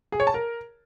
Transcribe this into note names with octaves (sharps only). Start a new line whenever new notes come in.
G#4
C#5
A5
A#4